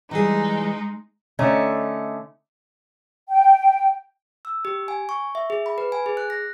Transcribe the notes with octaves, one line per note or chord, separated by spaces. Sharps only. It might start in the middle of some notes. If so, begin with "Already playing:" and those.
E3 G3 G#3 D#4 G#4
D3 A3 C#4 D#4
G5
E6
G4
G#5
C#6
E5
G#4
B5
B4
G#5
G#4
F#6
A#6